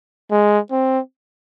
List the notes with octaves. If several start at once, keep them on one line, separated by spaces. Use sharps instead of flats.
G#3
C4